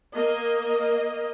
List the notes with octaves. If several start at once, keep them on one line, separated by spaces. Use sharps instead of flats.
A#3 D#5